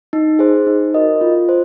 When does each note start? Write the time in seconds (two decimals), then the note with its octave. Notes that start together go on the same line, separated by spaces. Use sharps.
0.13 D#4
0.39 G#4 C5
0.67 D#4
0.94 F#4 A#4 D#5
1.21 F4
1.49 C5